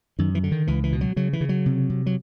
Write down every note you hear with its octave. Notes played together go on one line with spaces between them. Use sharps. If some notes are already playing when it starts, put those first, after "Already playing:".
F#2 D#3
E3
D3
D#3
C#2 E3
E3
B2
F#3
C#3 F#3
E3
C#3
F#3
C3
C3
F#3